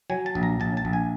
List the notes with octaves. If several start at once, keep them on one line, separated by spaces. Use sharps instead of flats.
F#3 G#5
A5
A#1
A#5
A#1 A5
A5
A#1
G#5